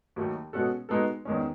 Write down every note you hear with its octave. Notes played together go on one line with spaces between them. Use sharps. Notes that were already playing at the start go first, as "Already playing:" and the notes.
D#2 D#3 F#3 A3
B2 G#3 C#4 F#4 A4
G#3 B3 D#4 F#4 A4
E2 D#3 G#3 C#4